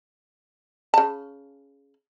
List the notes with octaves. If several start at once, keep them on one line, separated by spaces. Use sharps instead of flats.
C#3 A5